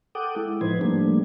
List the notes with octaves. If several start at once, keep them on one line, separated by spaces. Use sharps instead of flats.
A4 F#5 G5 D6 D#6
G#3 E4
A2 F3 D#4 B4 C5 G#6
F3 G3 A3 A#3 D4